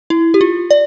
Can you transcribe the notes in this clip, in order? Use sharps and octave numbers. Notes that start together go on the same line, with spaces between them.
E4
G4
F4
D5